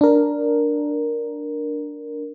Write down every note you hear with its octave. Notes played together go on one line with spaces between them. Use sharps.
D4 A#4